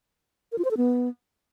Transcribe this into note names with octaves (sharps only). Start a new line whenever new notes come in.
A#4
F4
C5
A4
B3